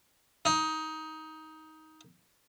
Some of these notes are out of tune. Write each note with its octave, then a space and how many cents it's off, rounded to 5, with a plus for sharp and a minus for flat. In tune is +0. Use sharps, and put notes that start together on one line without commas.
D#4 +15